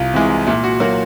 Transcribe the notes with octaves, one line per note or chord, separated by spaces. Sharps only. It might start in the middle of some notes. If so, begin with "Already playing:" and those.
Already playing: C2 F4
C3 E3 G#3
A#2 E4
F#4
F#3 A#3 F#4